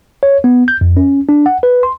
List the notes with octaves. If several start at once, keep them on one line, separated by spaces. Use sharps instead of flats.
C#5
B3
G6
F2
C#4
D4
F#5
B4
C6